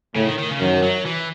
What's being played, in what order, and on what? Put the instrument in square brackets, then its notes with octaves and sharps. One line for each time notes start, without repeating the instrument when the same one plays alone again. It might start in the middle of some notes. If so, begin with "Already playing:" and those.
[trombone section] A2 [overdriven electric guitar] C#3
[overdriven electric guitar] D#3
D#3
C#3
[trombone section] F#2 [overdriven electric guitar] D#3
[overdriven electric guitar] F#3
E3